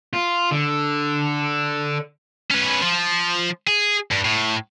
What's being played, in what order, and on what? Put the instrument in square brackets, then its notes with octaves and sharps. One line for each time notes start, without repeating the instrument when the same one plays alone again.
[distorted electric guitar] F4
D3
C#4 B4
F3
G#4
G2
A2